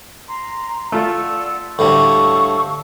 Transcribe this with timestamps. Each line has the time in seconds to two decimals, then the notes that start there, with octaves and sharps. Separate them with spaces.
0.28 A#5 C6
0.92 A3 F4 A4 D5 F#5 E6
1.79 D2 A2 G3 F5 A5 C#6 E6